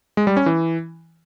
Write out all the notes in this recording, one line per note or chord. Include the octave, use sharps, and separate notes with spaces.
G#3
G3
C#4
E3